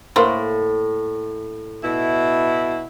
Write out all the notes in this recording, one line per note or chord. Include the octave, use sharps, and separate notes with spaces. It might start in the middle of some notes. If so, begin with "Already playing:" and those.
A2 A#3 C5 F#5
B2 E4